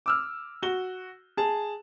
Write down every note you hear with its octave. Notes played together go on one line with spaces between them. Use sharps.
D6 E6 F6
F#4 G7
G#4 A5